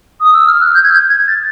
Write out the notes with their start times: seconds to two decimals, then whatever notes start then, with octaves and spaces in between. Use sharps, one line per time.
0.20 D#6
0.33 E6
0.46 F6
0.60 F#6
0.73 G6
0.83 G#6
0.92 G6
1.09 G#6
1.28 A6